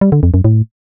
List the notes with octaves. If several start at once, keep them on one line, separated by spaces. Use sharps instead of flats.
G3
D3
F2
F#2
A2